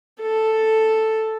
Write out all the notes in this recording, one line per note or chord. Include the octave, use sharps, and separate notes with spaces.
A4